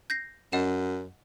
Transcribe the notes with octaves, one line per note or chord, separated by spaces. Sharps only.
G6 A#6 C7
F#2 D#5 F#5 E7